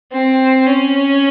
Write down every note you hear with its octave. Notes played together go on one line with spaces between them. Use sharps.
C4
C#4